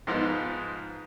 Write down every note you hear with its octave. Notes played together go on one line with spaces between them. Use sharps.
G#2 F3 G#3 B3 D#4